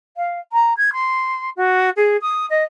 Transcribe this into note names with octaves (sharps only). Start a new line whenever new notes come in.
F5
A#5
G#6
C6
F#4
G#4
D#6
D#5